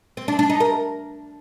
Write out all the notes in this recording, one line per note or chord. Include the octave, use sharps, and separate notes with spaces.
C4
D4
D4
D#4
A#4